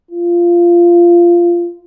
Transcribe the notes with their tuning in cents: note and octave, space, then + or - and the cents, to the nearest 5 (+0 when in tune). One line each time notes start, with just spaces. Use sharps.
F4 -15